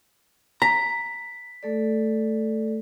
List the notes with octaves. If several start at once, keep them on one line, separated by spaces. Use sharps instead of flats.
A#5 B6
A3 A4 D5